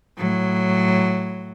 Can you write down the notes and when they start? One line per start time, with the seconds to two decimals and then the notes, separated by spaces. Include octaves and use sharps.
0.17 A2 F#3